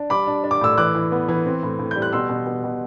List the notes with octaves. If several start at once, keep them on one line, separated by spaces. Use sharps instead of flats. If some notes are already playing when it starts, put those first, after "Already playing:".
Already playing: D4
G3 B5 D6
D4
D4
D6
A2 E6
E3 D6 F#6
E3
B3
E3
C4
A2
A2
G6
G3
F#6
B2 C6 E6
B2
B2
B2